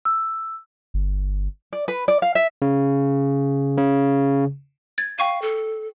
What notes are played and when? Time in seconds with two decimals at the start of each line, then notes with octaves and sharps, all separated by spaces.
0.05 E6
0.94 G1
1.73 D5
1.88 B4
2.08 D5
2.22 F5
2.35 E5
2.62 C#3
3.78 C#3
4.98 G#6 A6
5.19 F5 G5 C#6 D#7
5.42 A4